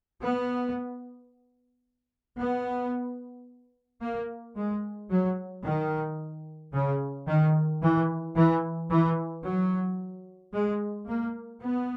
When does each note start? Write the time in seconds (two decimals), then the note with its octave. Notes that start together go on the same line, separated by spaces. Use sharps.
0.22 B3
2.39 B3
4.02 A#3
4.56 G#3
5.10 F#3
5.65 D#3
6.74 C#3
7.27 D#3
7.82 E3
8.36 E3
8.90 E3
9.44 F#3
10.53 G#3
11.07 A#3
11.62 B3